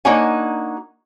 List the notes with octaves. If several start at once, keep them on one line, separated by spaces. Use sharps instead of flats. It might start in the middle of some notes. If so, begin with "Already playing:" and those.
A#3 D4 D#4 F#4 C#5 G#5